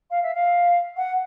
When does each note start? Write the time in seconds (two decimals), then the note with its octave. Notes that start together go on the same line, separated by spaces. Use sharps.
0.11 F5
0.22 E5
0.34 F5
0.97 F#5